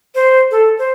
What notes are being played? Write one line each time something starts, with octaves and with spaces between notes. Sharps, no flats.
C5
A4
C5